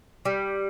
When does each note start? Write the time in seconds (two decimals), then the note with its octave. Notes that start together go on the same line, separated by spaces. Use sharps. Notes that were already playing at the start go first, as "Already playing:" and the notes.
0.25 G3